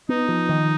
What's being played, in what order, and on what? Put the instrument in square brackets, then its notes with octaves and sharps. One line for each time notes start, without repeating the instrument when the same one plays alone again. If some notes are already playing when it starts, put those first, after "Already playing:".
[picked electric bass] B3 [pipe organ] D#4
[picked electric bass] F3
D#3